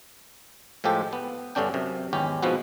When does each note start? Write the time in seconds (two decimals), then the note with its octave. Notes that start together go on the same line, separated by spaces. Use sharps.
0.84 A2 F3 G#3 G4 A4
1.13 B3
1.55 G1 G2 D3 C#4 D4 G5
1.74 F#2 C3
2.13 G#1 E2 C#4 G4
2.43 G#2 B2 F3 B3 F#4